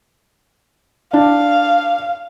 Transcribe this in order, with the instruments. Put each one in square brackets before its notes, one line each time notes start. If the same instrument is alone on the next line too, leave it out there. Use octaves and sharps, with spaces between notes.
[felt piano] D4 [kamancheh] F5